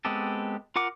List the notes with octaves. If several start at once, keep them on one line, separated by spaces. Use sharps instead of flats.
G#3 B3 C4 G4 A4
F4 A#4 F#5 D6